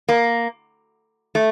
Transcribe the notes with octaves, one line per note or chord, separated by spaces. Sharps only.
A#3
A3